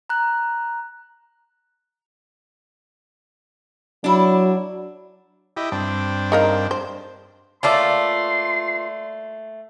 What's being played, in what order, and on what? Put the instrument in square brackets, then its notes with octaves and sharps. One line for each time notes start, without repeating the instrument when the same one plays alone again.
[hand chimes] A#5 F#6
[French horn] F#3 [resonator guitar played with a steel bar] D4 E4
[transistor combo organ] E4 G4 D#5
G2 C4 D4
[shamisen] D#4 A#4 F5
C5
[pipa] A3 A#3 [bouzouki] F4 B4 D5 [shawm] C6